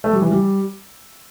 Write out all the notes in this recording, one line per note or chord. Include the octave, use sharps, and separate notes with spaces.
A3
G3
E3
G3